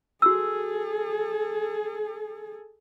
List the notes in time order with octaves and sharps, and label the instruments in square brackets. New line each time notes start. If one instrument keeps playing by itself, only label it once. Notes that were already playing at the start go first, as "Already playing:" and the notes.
[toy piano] F#4 E6 [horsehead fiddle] G#4 A4